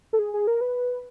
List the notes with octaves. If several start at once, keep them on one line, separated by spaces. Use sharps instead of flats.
A4
G#4
G#4
A#4
B4